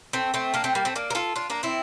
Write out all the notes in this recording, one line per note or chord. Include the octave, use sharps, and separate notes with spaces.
A3 C4
A3 C4
A#3 D4
A3 C4
G3 A#3
A3 C4
A#3 D4
A#4
F4 A4
D4 F4
A#3 D4
C4 E4